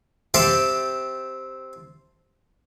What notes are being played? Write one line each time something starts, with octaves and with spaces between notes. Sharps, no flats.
C4 G4 A4 E5 F5 A5